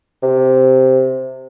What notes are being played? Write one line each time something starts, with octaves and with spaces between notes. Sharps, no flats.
C3